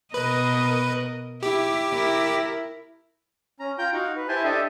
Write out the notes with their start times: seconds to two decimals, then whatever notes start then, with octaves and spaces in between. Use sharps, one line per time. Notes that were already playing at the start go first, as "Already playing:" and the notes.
0.14 B2 A#4 B4 D#5
1.43 E4 G4
1.93 E4 A#4
3.60 C#4 A#5
3.78 F4 G5 A#5 G6
3.93 D#4 F#4 F5 F#5
4.16 B4
4.28 E4 G4 C5 G#5 A5 C6
4.44 D4 G4 A4 D#5 E5